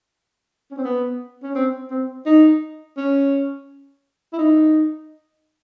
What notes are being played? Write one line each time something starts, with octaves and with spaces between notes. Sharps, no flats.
C#4
C4
B3
C#4
C4
C4
D#4
C#4
E4
D#4